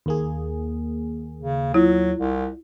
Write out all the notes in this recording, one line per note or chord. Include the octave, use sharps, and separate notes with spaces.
D#2 A#3 G#4
C#3
F#3 E4 F4
C2